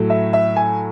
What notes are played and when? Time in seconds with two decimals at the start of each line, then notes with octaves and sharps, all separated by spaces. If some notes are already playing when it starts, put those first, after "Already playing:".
Already playing: A2 F#3 A3
0.10 E5
0.33 E5
0.56 G#5